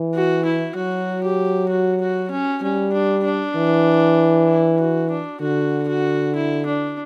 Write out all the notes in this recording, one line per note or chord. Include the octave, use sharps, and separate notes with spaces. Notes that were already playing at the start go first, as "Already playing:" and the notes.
Already playing: E3
F#4
E4
F#3 F#4
G4
F#4
F#4
C#4
G3 C#4
D4
D4
E3
E4
F#4
D4
D3 F#4
F#4
E4
D4